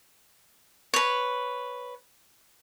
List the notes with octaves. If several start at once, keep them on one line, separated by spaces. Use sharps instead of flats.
B4 C#5